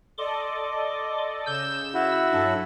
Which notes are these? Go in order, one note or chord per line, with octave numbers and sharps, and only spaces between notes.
A4 D5 D#5 C6 D6
C#3 E6 G6 E7
E4 F#4
G2 F#3 A4